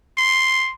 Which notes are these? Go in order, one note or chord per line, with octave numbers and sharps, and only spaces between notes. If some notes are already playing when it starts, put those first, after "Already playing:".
C6